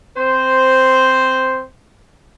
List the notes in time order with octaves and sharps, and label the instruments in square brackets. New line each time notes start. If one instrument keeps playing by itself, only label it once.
[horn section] C4 C5